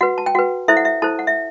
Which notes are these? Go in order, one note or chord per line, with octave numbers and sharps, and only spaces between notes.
F#4 B4 F#5
A5
G5
F#4 B4 F#5
E4 A4 C5 E5
F#5
E5
E4 A4 C5 A5
F#5
E5